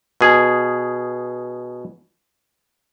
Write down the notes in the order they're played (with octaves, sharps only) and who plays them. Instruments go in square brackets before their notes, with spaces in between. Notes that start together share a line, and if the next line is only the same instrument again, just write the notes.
[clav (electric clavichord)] B2 G#4